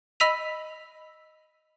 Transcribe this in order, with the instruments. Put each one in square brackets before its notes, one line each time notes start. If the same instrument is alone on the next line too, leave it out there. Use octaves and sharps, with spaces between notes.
[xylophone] D#5 B5 E6 B6 D#7 F7